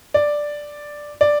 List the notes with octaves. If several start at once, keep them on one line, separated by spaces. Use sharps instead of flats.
D5
D5